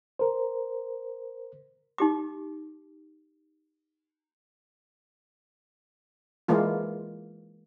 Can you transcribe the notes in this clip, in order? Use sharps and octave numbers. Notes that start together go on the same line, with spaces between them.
A#4 C5
D#4 G4 D6
E3 G#3 A#3 F4